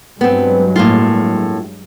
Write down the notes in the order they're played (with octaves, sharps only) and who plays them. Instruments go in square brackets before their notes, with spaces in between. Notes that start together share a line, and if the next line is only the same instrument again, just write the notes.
[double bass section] G2 F#3 G#3 [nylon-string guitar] B3 C4
[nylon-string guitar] A2 A#3 F4